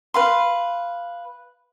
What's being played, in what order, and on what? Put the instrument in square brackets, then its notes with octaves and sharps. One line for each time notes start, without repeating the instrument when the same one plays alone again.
[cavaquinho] B4 F5 C6